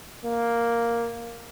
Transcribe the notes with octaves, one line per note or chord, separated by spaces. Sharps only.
A#3